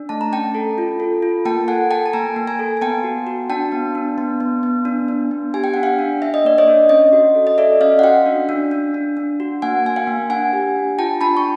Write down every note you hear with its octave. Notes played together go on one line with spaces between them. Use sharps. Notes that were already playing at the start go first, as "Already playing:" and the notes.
Already playing: D4
A3 A5
A#5
C#4 G5 A5
A4
F4
A4
F4
A#3 G5 A5
A4 F#5 G#5
A4 G5 A5
A5
A#3 G#5 A#5
A#3
G#5 A#5
A4
G#5
B3 G5 A5
F#4
F#4
D4 G5 A5
B3
D4
B3
B3
B3
D4
D4
B3
G4 G#5
G5
D4 F#5
F5 G5
D4
D4 E5
D#5
A#3 D5
C#5 D#5
D4
C#4 C#5 D#5
F#4
A4
D#5
A4 D5 E5
C#4 D#5 F5
F#5
F#4 F5 G5
D4
D4
D4
D4
D4
F#4
A#3 F#5 G#5
A#3 G#5
F5 G5
A#3
D4 F#5 G#5
G4
D4
F4 G5 A5
D4 A5 B5
C#6